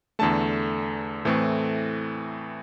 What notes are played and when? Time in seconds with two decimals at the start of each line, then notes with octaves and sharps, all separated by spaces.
0.19 E2 D3 A3 A5
1.25 A2 E3 A3 C4